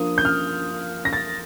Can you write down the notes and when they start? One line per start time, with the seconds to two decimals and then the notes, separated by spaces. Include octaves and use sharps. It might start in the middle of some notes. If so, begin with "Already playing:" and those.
Already playing: F3 A#3 D4 F4 D#6
0.18 G6
0.25 F6
1.05 A#6
1.13 A6